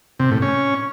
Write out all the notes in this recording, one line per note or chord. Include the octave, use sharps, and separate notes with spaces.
C3
A2
C#4